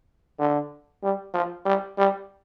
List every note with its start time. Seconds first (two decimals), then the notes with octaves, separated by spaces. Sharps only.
0.39 D3
1.03 G3
1.34 F3
1.65 G3
1.98 G3